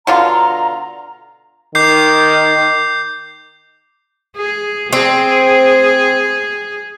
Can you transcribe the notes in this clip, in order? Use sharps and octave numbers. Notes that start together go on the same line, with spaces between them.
B2 D3 F4 A#5
D#3 D6 G6 C7
G#4
C4 G#4